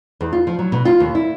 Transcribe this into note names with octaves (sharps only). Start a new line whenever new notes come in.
E2
F4
F3
F#3
B2
F4
D#2
E4